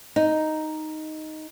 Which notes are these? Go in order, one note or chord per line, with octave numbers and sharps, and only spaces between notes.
D#4